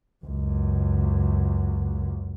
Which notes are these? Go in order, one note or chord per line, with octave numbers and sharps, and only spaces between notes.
C#2 F#2